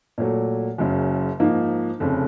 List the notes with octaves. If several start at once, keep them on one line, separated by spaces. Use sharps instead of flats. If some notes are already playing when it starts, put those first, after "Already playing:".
A#2 F#3 A3
F#1 F#2 C#3
G#2 F3 A#3 D#4
F1 F2 C#3